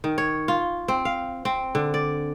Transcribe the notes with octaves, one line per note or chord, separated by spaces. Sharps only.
D#3
C#5
F4
C4
F5
C4
D3
D5